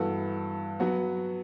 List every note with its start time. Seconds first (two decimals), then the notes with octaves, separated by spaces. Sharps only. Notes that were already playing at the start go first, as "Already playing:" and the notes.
Already playing: G2 E3 B3 F#4 A4
0.80 F#3 B3 F#4